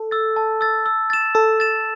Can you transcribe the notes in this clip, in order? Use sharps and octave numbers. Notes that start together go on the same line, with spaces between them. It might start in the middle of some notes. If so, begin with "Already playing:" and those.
Already playing: A4
E6 A6
A5
E6 A6
E6
A6 E7
A4 E6
A6 E7